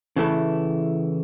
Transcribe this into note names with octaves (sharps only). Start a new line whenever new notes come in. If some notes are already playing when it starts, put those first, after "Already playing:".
C#3 E3 A3 E4